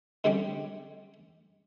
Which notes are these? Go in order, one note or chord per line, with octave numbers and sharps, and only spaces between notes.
D3 G3 G#3 C4 C#4 G4